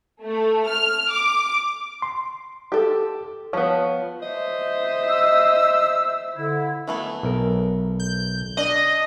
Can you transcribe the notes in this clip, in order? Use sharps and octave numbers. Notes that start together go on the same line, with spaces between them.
A3
F6
D6
C6
G4 A4
F3 B3 C#5
C5 D#5 E5
E6
D3 E4
E3 A3 B3
B1 A#4
G6
D4 D5 D#5